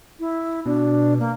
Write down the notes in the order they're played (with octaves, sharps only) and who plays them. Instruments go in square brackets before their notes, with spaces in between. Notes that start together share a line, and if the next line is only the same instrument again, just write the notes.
[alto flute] E4
[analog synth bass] B2 [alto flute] D4
[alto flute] A#3